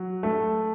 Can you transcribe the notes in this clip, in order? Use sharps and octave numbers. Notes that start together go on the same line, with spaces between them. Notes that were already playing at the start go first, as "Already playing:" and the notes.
Already playing: F#3
A3